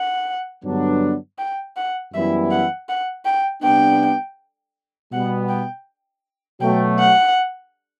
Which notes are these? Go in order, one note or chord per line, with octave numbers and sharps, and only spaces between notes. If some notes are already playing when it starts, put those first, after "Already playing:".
Already playing: F#5
G2 D3 F#3 B3 D4
G5
F#5
F#2 E3 G3 B3 E4 E5
F#5
F#5
G5
C3 G3 B3 D4 G5
B2 G3 B3 F#5
G5
B2 F#3 A3 G5
F#5